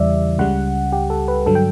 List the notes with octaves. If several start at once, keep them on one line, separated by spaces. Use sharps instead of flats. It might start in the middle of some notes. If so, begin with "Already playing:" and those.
Already playing: E2 C#3 E3 G3 D5 E5
C#2 C#3 G3 F#5
G4
A4
B4
G2 D3 F#3 A4
G5